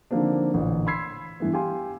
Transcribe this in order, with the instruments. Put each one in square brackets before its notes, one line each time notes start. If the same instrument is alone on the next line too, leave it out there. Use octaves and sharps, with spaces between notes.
[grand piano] D3 D#3 F3 A#3 C4 D4
A1 A#2 D3
B5 C6 E6 G#6 B6 C7
G2 E3 B3
G4 F5 G#5 C6